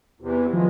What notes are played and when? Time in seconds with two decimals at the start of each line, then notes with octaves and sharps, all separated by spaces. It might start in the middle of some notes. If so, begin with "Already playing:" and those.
0.20 E2 C3 E3
0.53 D#3 F3 G#3